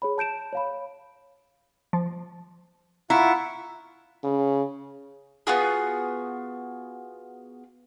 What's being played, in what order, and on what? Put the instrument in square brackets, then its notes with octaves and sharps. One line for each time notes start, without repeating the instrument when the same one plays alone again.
[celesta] G#4 C#5 B5
A5 G6 D7 E7
C#5 F5 B5
[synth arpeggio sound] F3
[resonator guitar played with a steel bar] E4 [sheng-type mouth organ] F4 F#5 C#6 [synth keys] A#5
[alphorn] C#3
[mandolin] B3 F4 F#4 G#4